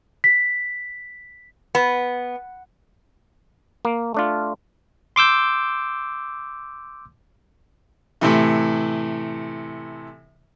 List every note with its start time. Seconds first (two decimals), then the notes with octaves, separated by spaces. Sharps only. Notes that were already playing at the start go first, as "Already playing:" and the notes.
0.24 B6
1.75 B3
3.85 A#3
4.14 A3 D4 F4
5.16 C6 D6 E6 G6
8.21 A2 C3 E3